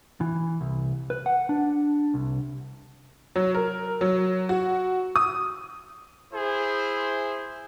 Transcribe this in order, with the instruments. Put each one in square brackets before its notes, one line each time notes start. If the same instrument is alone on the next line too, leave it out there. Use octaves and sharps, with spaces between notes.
[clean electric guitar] E3
C2
B4
F#5
D4
C2
[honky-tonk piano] F#3
A#4
F#3
F#4
D#6
[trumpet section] E4 G#4 C5